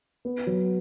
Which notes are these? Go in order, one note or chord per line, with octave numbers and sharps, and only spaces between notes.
B3
F#3